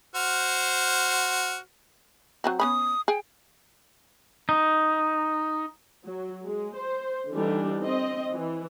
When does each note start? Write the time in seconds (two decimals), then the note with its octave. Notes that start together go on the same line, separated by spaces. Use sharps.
0.15 F#4 C5 F6
2.44 F#3 C4 F#4
2.60 B3 C#4 B5 D#6
3.08 G#4 G5
4.49 D#4
6.05 F#3
6.45 G#3
6.76 C5
7.31 D3 E3 G3 D4 D#4
7.82 C4 D#5
8.33 E3